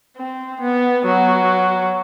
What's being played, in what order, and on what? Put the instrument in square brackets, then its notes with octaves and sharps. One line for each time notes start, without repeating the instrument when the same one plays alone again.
[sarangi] C4
B3
F#3